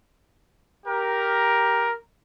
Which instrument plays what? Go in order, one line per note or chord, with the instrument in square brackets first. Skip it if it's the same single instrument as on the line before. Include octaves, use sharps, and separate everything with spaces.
[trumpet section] G4 A#4